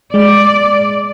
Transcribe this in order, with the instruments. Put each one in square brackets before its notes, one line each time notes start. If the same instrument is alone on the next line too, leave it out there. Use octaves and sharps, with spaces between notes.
[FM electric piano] G#3 [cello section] D5